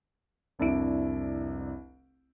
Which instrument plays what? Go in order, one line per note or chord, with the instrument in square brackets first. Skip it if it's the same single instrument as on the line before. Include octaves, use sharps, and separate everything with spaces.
[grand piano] F1 C2 D4 E4 D7